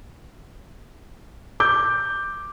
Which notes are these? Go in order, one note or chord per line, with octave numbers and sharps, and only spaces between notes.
D6 G6